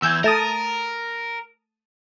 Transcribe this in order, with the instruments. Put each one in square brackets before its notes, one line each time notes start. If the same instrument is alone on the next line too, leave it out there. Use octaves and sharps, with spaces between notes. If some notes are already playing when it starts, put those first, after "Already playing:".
[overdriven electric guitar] E2 E3 [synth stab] E6 G6 G#6
[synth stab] A3 A5 D#6 [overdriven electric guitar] A#4